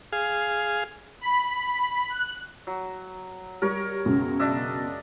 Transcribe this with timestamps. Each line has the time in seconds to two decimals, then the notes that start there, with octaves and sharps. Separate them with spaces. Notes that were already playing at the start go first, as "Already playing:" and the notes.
0.12 G#4 F5
1.21 B5
2.09 F#6
2.67 F#3
3.62 G3 A#4 C#5
4.05 C#2 F#2 B2
4.39 D4 D#5 E5